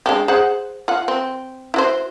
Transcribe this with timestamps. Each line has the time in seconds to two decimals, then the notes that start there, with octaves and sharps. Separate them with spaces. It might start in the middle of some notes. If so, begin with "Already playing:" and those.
0.06 G#3 D4 G4
0.28 G#4 C5 F#5
0.88 F4 F#5
1.08 C4
1.74 E4 F#4 C5